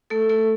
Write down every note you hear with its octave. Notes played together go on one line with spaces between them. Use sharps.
A3 A4
A3 A4